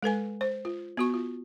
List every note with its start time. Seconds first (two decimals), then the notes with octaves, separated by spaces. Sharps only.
0.02 G#3 A4 B4 G#5
0.41 C5
0.65 F4
0.97 B3 F#4 C#6
1.14 F4